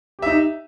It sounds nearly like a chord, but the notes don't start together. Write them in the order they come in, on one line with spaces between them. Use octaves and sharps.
G4 E5 D#4